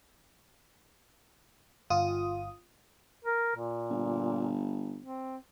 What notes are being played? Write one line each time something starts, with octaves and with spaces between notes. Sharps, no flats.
G1 F4 D#6
A#4
A#2
G1
C4